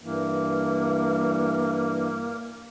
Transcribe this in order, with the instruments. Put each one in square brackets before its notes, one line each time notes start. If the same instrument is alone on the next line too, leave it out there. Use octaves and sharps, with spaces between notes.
[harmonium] G2 E3 [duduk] A#3